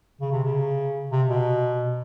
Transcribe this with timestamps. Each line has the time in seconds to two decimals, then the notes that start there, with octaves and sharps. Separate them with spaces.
0.21 C#3
0.32 C3
0.44 C#3
1.12 C3
1.28 B2